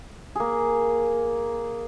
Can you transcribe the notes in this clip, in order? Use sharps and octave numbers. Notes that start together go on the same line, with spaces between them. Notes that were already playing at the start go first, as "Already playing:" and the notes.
A#3 G#4